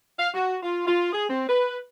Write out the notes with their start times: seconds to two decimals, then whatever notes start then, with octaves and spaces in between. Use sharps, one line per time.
0.19 F5
0.34 F#4
0.63 F4
0.87 F4
1.13 G#4
1.30 C4
1.49 B4